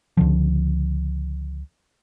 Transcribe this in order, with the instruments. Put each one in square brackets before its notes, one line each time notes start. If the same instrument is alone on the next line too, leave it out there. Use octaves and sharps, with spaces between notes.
[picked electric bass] C#2 D3 F3